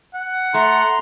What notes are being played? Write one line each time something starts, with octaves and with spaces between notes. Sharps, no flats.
F#5
A3 A#5 C6